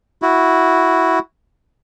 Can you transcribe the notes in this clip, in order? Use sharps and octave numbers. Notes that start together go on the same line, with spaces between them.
E4 F#4